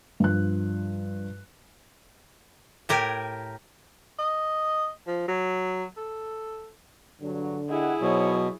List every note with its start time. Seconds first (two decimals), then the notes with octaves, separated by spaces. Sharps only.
0.20 G2 F3 F#6
2.89 A2 G4 A#4 G#5
4.19 D#5
5.07 F3
5.28 F#3
5.97 A4
7.22 G2 D3 F#3
7.70 E4 G4 G#4 D#5 F#5
8.01 B2 F#3 D#4 C5 C#5